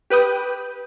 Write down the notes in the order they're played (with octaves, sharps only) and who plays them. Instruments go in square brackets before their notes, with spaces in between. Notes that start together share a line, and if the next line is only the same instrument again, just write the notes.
[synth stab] G4 B4 G5 D#6